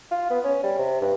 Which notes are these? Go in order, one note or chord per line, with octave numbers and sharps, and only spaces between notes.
F4
B3
C#4
G3
C3
G2